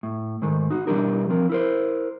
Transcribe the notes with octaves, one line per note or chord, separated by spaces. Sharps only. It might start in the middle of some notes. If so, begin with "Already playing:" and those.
A2
G#2 D#3 G#3 A3
D#4 F#4
B2 E3 G3 D4 G4 A#4
F3 C4 A#4
E4 A#4 C5